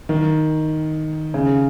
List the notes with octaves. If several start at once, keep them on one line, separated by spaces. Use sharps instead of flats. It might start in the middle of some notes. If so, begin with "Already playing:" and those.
D#3
C#3